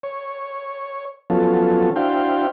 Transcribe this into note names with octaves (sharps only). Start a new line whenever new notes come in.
C#5
F3 F#3 B3 C#4 F4 A4
D4 E4 F#4 C5 F5 G5